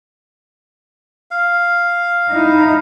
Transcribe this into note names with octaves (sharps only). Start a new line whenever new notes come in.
F5
D#4 E4